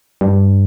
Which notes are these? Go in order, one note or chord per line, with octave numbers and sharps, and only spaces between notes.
G2